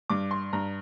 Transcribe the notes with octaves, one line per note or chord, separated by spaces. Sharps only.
G2 D6
C6
G2 A#5